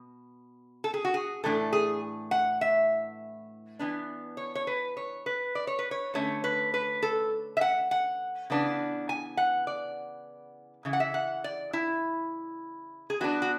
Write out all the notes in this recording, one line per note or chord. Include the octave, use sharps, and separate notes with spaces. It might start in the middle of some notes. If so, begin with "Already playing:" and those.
Already playing: B2
A4
G#4
F#4
G#4
A2 E3 A3 D4 A4
G#4
F#5
E5
E3 B3 D4
C#5
C#5
B4
C#5
B4
D5
C#5
B4
C#5
D3 A3 C#4 C#5
B4
B4
A4
E5
F#5
F#5
C#3 E3 B3 D4
G#5
F#5
D5
C#3 E3
F#5
E5
F#5
D5
E4
G#4
E3 B3 D4 F#4
F#4